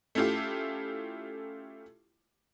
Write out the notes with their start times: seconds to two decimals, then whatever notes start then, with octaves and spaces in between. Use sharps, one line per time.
0.15 A3 C#4 E4 F4 G4